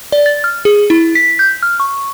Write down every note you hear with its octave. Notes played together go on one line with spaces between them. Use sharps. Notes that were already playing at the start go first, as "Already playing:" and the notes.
D5
A6
F6
G#4
E4
B6
G6
F6
C#6